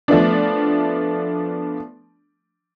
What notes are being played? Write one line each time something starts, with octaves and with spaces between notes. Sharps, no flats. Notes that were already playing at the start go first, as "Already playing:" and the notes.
F3 A3 B3 D4